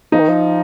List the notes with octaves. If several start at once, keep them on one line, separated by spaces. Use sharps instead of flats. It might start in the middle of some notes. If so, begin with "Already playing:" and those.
F3 D#4
D#3
F3